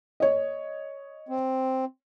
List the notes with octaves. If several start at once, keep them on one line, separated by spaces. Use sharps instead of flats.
C#5 D#5
C4